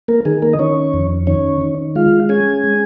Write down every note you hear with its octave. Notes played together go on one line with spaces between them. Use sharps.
A#3 A#4
D#3 G#4
A#3 A#4
D#5
D#3 C#4 C#5
F2
D#3 C#4 C#5
D#3
G#3 F4 F5
C#4 G#4 G#5
G#3